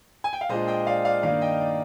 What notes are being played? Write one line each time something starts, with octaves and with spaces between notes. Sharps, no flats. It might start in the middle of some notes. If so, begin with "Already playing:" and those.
G#5
G5
F5
A#2 G#3 D4 F4 C5 D#5
D#5 G5
D5 F5
D5 F5
G2 D#3 A#3 D#4 D5 F5
D#5 G5
D5